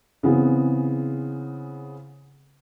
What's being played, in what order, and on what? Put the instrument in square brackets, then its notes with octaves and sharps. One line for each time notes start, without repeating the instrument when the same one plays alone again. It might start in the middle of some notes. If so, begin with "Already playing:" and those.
[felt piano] C#3 E3 B3 C4 G#4